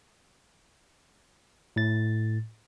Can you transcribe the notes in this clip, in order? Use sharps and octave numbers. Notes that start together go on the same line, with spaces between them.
A2 A6